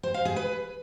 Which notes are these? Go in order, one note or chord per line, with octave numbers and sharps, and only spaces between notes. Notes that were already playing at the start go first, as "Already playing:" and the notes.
C5
F5
G#4
B4